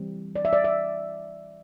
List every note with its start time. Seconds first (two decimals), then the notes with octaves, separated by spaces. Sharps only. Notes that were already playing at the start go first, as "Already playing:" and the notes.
Already playing: E3 G3 C4
0.36 D5
0.45 E5
0.53 D5
0.64 E5